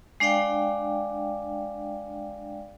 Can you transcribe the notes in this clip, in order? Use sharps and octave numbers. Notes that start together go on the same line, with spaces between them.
G#3 D4 D5 F5 G5